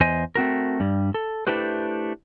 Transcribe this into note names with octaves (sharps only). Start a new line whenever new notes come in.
E2 C5 D#5 G#5
A3 C4 F#4 A#4
G2 G3
A4
A3 D4 E4 G4 B4 C5